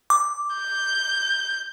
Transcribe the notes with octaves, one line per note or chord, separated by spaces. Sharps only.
D6
G6